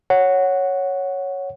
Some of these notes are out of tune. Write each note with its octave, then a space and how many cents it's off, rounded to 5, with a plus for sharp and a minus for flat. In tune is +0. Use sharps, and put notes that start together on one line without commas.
C#5 +0 F#5 +0